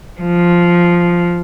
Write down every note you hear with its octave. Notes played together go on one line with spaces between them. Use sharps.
F3